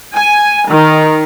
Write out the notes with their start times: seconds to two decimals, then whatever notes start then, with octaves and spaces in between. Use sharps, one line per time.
0.15 G#5
0.68 D#3